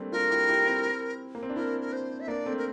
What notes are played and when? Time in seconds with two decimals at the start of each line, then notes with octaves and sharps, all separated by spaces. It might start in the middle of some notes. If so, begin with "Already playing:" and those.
Already playing: G3 A3 A#3 C4 D4
0.12 D4 F4 A#4
0.30 E4 G4
0.49 E4 G4
0.66 C4 E4
1.35 A#3
1.43 C4
1.50 D4
1.56 C4 E4 A#4
1.81 A#4
1.93 C5
2.20 E5
2.27 A#3 D4 D5
2.45 A3 C4
2.57 A#4